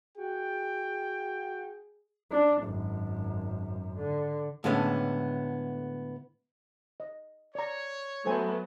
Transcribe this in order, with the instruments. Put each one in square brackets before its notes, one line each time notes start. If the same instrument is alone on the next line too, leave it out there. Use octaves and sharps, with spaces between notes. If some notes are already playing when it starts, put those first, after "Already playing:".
[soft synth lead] F#4 [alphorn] G#4 [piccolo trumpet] G5
[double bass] D4
G#1 F#2
D3
[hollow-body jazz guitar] A2 D3 G#3 B3 C#4
[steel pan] D#5
[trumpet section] C#5 [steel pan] D5 A#5
[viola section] F#3 B3 [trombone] A3 [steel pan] A4 C5 G#5